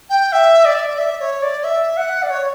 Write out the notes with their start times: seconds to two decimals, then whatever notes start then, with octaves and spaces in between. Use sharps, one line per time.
0.10 G5
0.32 E5
0.65 D5
0.89 D5
0.98 E5
1.20 C#5
1.42 D5
1.64 E5
1.97 F#5
2.23 D5
2.30 C#5